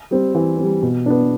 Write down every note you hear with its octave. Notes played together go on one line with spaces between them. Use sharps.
G3 C4
E3
G3 C4
B2
B3 D4